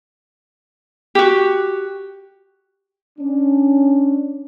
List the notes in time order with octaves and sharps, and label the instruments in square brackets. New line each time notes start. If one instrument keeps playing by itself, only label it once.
[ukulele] F#4 G4
[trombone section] C#4 D4